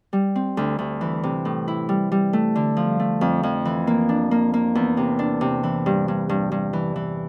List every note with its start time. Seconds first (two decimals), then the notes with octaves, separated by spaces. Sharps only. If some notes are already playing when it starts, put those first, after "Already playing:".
0.13 G3
0.35 C4
0.57 D2
0.79 D2
1.01 E3
1.23 C3
1.45 A2
1.68 E4
1.89 G3
2.12 G3
2.33 A3
2.55 D3
2.77 F3
3.00 A3
3.21 F2
3.43 F2
3.65 E3
3.87 A#3
4.09 D4
4.31 A#3
4.54 A#3
4.75 E2
4.97 C3
5.19 D4
5.41 C3
5.63 E3
5.86 G2
6.08 G2
6.29 G2
6.52 G2
6.73 E3
6.96 E3